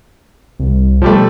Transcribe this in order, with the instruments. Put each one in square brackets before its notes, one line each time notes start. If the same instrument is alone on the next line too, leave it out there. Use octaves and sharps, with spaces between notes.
[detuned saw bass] C2
[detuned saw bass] B2 [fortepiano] F3 G3 A3